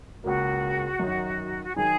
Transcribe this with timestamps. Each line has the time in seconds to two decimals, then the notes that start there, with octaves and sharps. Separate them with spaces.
0.23 C#2 C#3 A#3 F#4
1.00 F#2 D#3 F#3 D#4
1.64 F#4
1.76 D#3 F#3 D#4 G#4